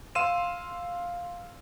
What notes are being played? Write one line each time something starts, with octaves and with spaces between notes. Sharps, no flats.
F5 C6 E6 D#7 E7